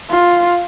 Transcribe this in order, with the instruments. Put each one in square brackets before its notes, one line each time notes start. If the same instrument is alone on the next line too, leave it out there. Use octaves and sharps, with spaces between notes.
[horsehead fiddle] F4